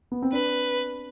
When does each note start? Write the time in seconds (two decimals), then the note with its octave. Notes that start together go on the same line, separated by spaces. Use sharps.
0.12 B3
0.22 C4
0.33 D4 B4